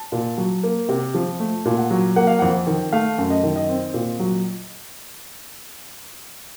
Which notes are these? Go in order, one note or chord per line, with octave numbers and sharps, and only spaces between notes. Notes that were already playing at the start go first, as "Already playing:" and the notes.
Already playing: A5
A#2
F#3
A#3
C3
F3
A3
A#2
F#5
F#3
A#3 F#5
F5
F2 F#5
D#3
A3 F5
F#2
D#5
D#3
D#5
C4
A#2
F#3